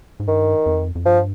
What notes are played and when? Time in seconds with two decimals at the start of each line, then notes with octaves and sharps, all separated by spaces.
0.20 G#2
0.27 G2 D#3
0.66 F2
0.95 F2
1.05 G2 F3